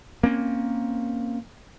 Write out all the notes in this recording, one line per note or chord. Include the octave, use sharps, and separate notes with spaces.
A#3 C4 C#4